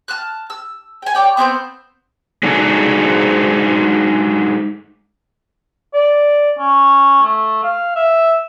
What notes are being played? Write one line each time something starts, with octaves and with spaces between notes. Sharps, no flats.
A5 F6 F#6
E6
G5 G#5
C#5 D5 G5
B3 C4 C5 G6
G#3 D4 D#4 F#4 G#4 A4
D5
C#4
A3
F5
E5